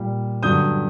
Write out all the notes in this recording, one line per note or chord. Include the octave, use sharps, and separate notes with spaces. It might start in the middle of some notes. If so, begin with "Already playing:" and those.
Already playing: A#2 G3
G2 D3 F#3 D#6 G6